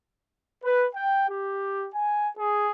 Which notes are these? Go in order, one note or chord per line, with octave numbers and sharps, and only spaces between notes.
B4
G5
G4
G#5
G#4